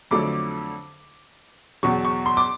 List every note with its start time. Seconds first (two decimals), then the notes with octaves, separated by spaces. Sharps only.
0.11 F2 D3 F#3 A3 D6
1.83 E2 B2 F#3 C#6
2.05 C#6
2.26 C6
2.37 D6